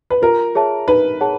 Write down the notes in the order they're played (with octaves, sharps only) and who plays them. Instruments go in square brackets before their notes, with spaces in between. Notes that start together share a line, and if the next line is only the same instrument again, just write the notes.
[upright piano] B4
[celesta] F4 [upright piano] A#4
[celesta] G#4 C#5 E5 A5
[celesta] D#4 [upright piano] B4
[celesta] G#4 C#5 F#5 A5